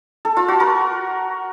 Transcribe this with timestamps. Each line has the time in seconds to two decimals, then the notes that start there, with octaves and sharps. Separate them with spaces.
0.25 A4
0.37 F4
0.48 F#4
0.60 A#4